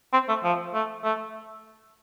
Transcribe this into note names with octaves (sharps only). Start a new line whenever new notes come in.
C4
A3
F3
A3
A3